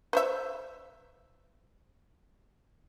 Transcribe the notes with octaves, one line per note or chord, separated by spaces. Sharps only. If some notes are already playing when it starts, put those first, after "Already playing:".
B4 C5 E5